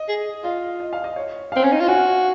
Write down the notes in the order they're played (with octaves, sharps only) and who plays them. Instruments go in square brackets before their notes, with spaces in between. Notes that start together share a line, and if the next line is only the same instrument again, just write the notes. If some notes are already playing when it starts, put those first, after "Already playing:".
Already playing: [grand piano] D#5
[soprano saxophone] G#4
[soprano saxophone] F4 [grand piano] D#5
[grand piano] D#5
F5
D#5
C#5
[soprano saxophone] C4 [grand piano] F5
[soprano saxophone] C#4
D#4
F4
[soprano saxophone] F#4 [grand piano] G#5